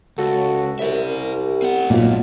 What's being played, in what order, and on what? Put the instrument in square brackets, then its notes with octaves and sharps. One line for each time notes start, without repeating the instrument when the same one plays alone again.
[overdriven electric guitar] C#2 [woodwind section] F#4 A4
[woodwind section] C2 [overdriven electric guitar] A#4 E5
[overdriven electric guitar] C4 F#5
[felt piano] B1 F4 [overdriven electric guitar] F2 A3 [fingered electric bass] A#2